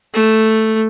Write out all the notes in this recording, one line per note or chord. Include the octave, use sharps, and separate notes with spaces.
A3